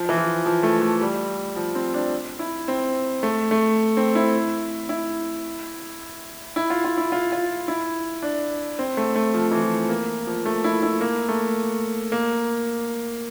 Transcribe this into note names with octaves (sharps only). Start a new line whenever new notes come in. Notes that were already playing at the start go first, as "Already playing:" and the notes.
Already playing: F3
E3
F3
F3
A3
A3
G3
F3
C4
D4
E4
C4
A3
A3
C4
E4
E4
E4
F4
F4
E4
F4
F4
E4
D4
C4
A3
A3
F3
E3
F3
A#3
F3
A3
E4
E4
A#3
A3
A#3